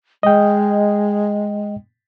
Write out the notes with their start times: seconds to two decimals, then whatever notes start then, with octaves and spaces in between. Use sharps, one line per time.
0.23 G#3 D#5 G5